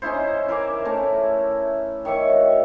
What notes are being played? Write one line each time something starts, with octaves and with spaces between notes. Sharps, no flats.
C#4 D#4 E4 C5
E4 A#4 G#5 D6
A3 C#4 A#5
D#3 C#5 E5 C#6
F#4